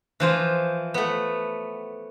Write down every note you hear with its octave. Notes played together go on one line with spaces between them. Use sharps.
E3 F3 C5
A3 B3